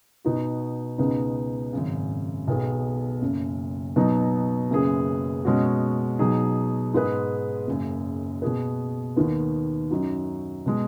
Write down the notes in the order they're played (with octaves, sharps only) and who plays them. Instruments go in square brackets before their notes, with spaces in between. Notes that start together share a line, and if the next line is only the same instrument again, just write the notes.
[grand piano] B2 B3 D#4 F#4
C#2 B2 B3 D#4 G#4
G#1 F#2 C#3
B1 B2 B3 G#4
F#1 F#2 C#3
B2 F#3 B3 D#4
F#1 F#2 C#3 B3 G#4
B2 G#3 C#4 F#4
B2 F#3 D#4 G#4
G#2 G#3 B3 G#4 B4
F#1 F#2 C#3
B2 B3 G#4 B4
D#2 D#3 B3
F#2 F#3 D#4 F#4
B2 G#3